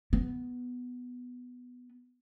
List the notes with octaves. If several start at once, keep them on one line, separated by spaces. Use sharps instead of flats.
B3